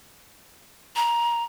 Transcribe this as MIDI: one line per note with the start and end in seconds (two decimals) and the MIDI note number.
0.96 1.44 82